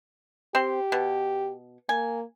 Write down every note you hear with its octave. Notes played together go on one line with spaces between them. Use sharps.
C4 G4 C6
B2
A#3 G#5